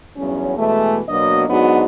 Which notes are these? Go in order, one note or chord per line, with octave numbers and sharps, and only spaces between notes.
E2 G2 F#3 C#4
B2 E3 G#3 A3
B2 F#3 A#3 B3 D4 D#5
G#2 F#3 B3 D4 D#4 F#4